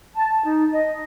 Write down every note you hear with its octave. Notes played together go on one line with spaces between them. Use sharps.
A5
D#4
D#5